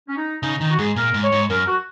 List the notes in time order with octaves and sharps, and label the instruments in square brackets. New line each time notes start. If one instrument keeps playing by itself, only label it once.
[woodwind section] C#4
D#4
[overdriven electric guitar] C#3 [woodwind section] D#4
[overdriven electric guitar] D#3 [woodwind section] D#4
[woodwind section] F#4
[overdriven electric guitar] G#2 [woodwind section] G#4
[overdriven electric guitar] A#2 [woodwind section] A#4
[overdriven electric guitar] G#2
[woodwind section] C#5
[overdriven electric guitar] G#2
[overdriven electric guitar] F#2 [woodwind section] A#4
[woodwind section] F#4